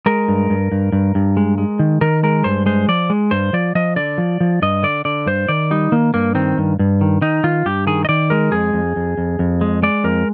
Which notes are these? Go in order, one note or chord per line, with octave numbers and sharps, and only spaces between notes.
G#3 A#4
G2
G2
G2
G2
G2
G#3
G#3
D#3
D#3 A#4
G#3 A#4
G2 C5
G#3 C5
F3 D5
G#3
G2 C5
F3 D5
F3 D#5
D3 D5
F3
F3
G2 D#5
D3 D5
D3 D5
G2 C5
D#3 D5
G3 D#4
D#3 A#3
G2 A#3
D#3 C4
G2
G2
D#3
D#3 D#4
D#3 F4
G2 G4
D#3 G#4
D#5
D#3 D5
G#3 A#4
F2 G#4
F2
F2
F2
F2
G#3
G#3 D5
F2 A#4